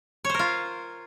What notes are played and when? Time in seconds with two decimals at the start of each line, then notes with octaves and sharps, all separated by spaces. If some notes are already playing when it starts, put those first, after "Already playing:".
0.25 C#5
0.29 C5
0.34 A#4
0.39 F4